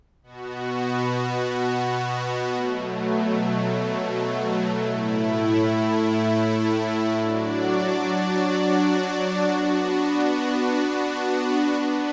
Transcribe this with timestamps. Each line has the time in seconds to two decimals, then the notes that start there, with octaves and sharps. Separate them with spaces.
0.23 B2 B3 F#4
2.54 B2 F#3 A3
4.85 A2 A3 E4
7.16 F#3 D4 F#4 D5
9.46 B3 D4 F#4
11.77 B3 D4 B4